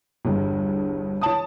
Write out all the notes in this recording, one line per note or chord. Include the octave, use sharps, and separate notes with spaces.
G1 E2 G2
E3 C#5 A5 D#6